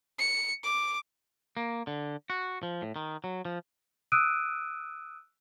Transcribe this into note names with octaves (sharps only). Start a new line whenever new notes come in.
C#7
D6
A#3
D3
F#4
F3
A2
D#3
F#3
F3
D#6 E6 F#6 D7 D#7